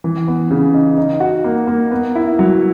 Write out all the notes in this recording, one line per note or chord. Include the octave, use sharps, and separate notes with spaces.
E3
B3
C#3
D#4
D#4
F#4
A#3
A#3
B3
E4
F#3